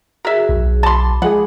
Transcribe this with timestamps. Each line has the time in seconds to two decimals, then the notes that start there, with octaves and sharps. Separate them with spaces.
0.25 F#4 G#4 A#4 E5
0.49 B1
0.83 A5 B5 C6 D6
1.22 F3 G#3 G#4 F#5